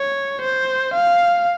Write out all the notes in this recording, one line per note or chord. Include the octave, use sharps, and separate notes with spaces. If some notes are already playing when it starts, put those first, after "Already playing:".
Already playing: C#5
C5
F5